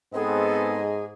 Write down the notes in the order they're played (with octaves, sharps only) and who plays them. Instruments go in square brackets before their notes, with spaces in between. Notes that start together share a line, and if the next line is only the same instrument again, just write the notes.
[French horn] G#2 [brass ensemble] B3 C4 A4 [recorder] G#4 [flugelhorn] D#5